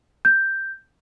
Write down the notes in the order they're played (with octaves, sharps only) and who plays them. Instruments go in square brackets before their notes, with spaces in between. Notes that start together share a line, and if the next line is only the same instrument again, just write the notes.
[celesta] G6